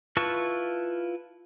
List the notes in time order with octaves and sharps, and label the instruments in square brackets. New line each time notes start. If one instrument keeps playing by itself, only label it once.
[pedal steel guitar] E4 F4 B4 A5 C#6